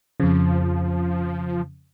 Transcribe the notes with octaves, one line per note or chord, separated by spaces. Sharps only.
F2 C#3 F3